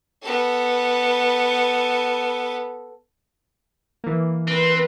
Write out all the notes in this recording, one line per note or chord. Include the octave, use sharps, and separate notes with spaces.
B3 A4
E3 A#3
C4 B4